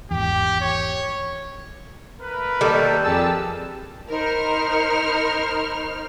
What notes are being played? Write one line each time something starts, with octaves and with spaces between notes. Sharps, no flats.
G#1 E2 G4
C#5
A3 A#4 B4
D#3 G3 A#3 A4
F2 G4 G#4 A5 E6
D#4 A#4 C5 B5 F6